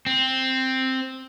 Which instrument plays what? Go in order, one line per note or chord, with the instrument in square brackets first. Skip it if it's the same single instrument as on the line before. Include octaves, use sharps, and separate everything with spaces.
[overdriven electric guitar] C4